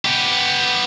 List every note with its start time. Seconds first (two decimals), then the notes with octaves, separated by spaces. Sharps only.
0.05 B3 G4